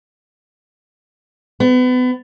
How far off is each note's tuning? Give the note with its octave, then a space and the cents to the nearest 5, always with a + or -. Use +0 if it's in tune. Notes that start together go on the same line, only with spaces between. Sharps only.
B3 +30